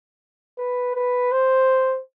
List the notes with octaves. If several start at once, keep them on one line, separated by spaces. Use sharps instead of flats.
B4
B4
C5